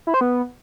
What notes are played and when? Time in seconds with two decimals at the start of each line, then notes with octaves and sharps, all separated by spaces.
0.07 E4
0.14 C5
0.21 B3